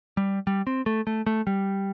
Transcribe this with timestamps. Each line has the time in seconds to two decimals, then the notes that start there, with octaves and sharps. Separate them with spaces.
0.17 G3
0.47 G3
0.67 C4
0.86 A3
1.07 A3
1.26 A3
1.47 G3